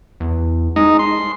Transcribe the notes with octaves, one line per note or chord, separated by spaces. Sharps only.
E2
G#3 D#4
C6